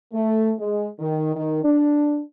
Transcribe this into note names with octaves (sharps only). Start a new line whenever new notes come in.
A3
G#3
D#3
D#3
D4